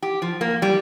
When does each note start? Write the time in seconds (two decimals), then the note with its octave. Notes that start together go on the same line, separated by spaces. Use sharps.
0.02 G4
0.22 F3
0.41 A#3
0.62 G3